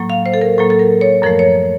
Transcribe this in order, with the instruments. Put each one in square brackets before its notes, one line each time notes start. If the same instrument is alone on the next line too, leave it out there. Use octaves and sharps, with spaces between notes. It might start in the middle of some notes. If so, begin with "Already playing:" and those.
Already playing: [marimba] A2 F#3 A#3
F5
C5
A4
A#4
A2 F#3 A#3 A4
A4
A#4
C#5
F#2 F3 A3 A#4
C#5